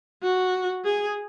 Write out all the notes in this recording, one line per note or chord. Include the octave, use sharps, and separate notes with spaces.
F#4
G#4